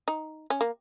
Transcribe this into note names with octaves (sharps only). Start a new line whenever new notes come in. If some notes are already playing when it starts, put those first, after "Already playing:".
D#4
C#4
A#3